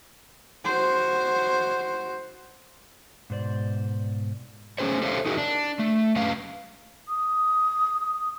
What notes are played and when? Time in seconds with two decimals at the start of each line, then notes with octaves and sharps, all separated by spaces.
0.65 F#4 C5
3.30 G#2 B2 C5 D5
4.78 A3 C#4 G#4 C5 C#5
5.02 G4 A4 C5 C#5 E5 F5
5.26 D#4 F#4 G#4 A#4 E5
5.38 D4
5.79 A3
6.16 F#2 C#4 B4 F5
7.08 D#6